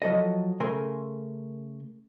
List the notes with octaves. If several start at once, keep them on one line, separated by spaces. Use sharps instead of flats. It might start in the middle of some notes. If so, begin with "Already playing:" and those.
F3 F#3 A4 D#5
C#3 A3 A#4 G#5 C6